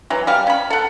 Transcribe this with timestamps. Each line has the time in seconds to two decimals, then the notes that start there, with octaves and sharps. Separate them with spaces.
0.10 E3 F#3
0.27 G3 F5
0.47 C#4 B5
0.70 A4 F#5